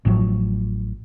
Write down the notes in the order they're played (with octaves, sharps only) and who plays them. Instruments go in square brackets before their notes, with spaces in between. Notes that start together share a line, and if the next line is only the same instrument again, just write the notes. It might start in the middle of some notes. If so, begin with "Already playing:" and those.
[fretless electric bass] A1 A2 F3 F#3